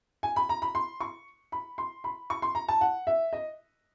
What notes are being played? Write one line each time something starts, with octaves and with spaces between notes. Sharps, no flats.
G#5
B5
A#5
B5
C6
C#6
B5
C6
B5
C#6
C6
A#5
A5
F#5
E5
D#5